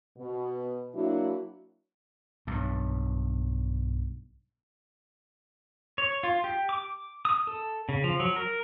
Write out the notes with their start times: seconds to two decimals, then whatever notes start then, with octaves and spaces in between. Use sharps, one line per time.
0.18 B2
0.94 F#3 A#3 D4 E4 F#4
2.47 B1 G2
5.98 C#5
6.23 F4
6.44 G4
6.69 D6
7.25 D#6
7.47 A4
7.89 C#3
8.04 F3
8.20 F#3
8.36 A#4